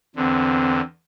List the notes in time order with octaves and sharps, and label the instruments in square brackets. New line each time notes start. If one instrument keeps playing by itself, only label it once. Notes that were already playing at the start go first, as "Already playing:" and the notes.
[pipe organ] E2 D3 [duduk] C4